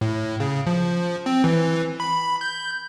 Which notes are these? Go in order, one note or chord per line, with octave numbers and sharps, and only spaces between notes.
A2
C#3
F3
C4
E3
B5
G6